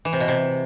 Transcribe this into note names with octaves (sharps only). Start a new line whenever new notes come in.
E3
C3
B2
C3